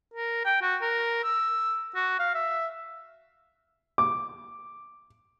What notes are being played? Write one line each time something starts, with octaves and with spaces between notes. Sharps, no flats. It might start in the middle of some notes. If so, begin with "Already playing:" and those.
A#4
G5
F#4
A#4
E6
F#4
F5
E5
D6